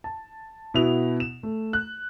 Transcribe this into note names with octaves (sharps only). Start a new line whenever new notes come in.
A5
B2 B3 E4 F7
E7
A3
F#6